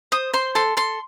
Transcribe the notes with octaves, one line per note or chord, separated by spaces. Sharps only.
C5 D#6
C5 C6
A4 C6
A4 C6